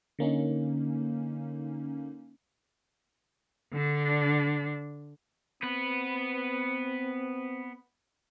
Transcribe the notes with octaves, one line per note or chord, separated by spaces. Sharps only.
D3 A#3 C#4 D#4
D3 D4
B3 C4 B4